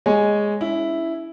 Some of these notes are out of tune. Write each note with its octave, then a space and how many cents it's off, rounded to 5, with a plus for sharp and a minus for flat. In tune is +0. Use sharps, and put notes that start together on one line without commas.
G#3 -5 C#5 +0 G#5 +0
C#4 +40 E4 +0